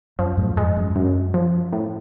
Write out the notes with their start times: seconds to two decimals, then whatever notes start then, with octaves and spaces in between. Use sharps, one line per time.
0.19 F#2 F3
0.37 F#2 A2
0.56 F2 G#2 G#3
0.76 F#2
0.96 F#2
1.34 F3
1.73 A2